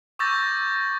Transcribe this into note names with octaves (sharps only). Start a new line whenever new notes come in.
C#6 D6 E6 G6 A6 A#6